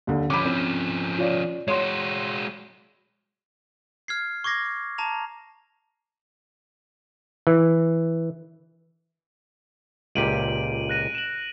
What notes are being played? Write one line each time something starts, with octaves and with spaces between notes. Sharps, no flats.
D#2 D3
F3 C#4 B5 D6
C4
F4 C#5 D5
G#3 F#4 C#5 C6
F6 G#6 C7
C#6 D6 G#6 A#6 C7
A5 A#5 F7
E3
C#2 A#2 G4 D7 D#7 F#7
F#6 A#6 D#7
E7 F#7